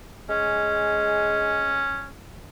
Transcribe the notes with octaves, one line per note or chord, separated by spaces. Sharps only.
G#3 C#4